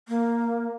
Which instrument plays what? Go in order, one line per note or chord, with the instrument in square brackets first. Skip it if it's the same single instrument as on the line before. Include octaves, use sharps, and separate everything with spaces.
[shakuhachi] A#3